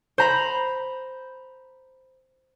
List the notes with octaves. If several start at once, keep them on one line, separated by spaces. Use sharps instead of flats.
C5 A#5 B5